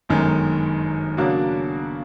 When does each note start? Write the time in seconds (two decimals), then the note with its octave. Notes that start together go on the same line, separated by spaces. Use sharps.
0.09 G1 F#2 D#3 G#3
1.17 C#3 F#3 A#3 D4 F#4